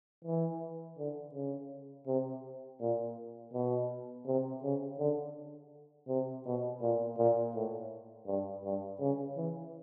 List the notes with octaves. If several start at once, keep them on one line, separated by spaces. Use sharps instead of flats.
E3
D3
C#3
C3
A#2
B2
C3
C#3
D3
C3
B2
A#2
A#2
A2
G2
G2
C#3
E3